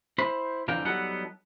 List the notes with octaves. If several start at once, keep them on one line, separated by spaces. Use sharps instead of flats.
E4 C5 B5
F2 D3 E3 A#4 F5 G5
F#3 G3 B3 D#4 A4 F#5